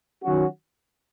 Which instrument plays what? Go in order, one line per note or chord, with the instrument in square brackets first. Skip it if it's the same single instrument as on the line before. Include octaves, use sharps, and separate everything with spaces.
[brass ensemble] D#3 F#3 C#4 F#4